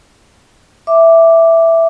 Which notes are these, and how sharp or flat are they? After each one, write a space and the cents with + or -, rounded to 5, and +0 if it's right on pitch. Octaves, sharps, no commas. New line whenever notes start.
E5 +0 D6 +0